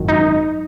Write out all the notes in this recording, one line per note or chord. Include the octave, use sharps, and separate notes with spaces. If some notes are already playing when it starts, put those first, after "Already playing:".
Already playing: G#1 F#2 D#3 F#3
D#4